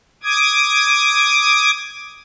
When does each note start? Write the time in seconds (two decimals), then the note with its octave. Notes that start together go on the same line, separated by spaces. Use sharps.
0.23 D6 D#6 G#6